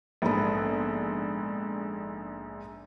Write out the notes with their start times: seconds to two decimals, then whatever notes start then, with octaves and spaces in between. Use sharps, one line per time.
0.22 A#1 G#2 B3 A4 B5